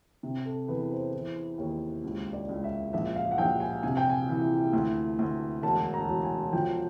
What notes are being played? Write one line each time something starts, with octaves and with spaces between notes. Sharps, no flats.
C3
A4
E2 B4
C5
E3
D#2
C#2
D5
C#2
E5
A#1 E5
F5
F#5
A#1 G5
G#5
C3 G#5
G5
G#5
E3
D2
D2
E1 A5
A#5
E1
G#5
F3 G5